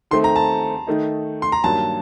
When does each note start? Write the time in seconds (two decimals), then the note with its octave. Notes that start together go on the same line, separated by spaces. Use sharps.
0.11 D#3 A3 C4 C6
0.24 A#5
0.36 A5
0.87 D#3 A3 D#4
1.42 C6
1.52 A#5
1.64 G2 D#3 F#3 A#3 A5